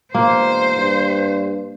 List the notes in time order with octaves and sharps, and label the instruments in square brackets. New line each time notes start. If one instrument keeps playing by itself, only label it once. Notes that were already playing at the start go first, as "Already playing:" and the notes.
[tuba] E1 [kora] A#3 [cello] C5
[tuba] G2